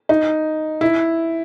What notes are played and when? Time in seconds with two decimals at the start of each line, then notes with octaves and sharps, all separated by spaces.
0.09 D#4
0.81 E4